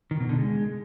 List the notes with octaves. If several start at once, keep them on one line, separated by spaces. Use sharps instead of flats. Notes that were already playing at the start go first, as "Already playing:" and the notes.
D#3
B2
D3
G#3